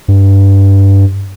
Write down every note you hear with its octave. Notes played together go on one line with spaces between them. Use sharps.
G2